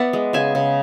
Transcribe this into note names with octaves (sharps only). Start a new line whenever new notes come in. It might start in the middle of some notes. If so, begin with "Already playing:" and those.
Already playing: B3 D5 E5 F#5
G#3
C#3 E5 G#5
C#3